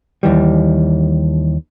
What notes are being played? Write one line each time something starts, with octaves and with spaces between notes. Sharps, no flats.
D#2 E3 G3